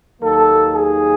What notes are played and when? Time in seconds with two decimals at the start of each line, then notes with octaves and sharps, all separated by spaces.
0.21 D#2 D#3 F#3 A#3 A4
0.73 G#4